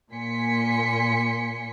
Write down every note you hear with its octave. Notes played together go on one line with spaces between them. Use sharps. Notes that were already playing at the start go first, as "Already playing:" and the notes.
A#2 A#3 G#5 C6 B6 C#7